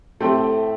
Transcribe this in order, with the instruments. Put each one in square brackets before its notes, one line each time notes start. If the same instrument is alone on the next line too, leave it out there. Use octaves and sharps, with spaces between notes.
[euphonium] A2 [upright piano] A3 C4 G4